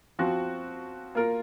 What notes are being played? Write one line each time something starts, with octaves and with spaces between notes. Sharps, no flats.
F3 C4 F#4
A#3 F4 A#4